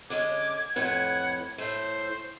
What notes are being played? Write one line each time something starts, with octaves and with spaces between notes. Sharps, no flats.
D3 G#3 C#4 D6 G#6
F2 A2 B4 F#5
A2 A3 C5